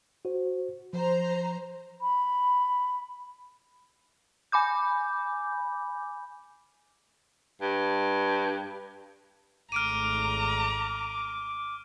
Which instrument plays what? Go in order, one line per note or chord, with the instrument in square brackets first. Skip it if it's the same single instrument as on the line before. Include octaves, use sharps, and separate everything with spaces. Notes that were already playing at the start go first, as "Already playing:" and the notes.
[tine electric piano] F#4 C5
[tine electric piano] F3 [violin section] C5 A#5
[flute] B5
[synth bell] G#5 B5 D6 G6
[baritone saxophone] G2
[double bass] G#1 A3 [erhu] A#5 [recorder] D6 [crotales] F6 D7 D#7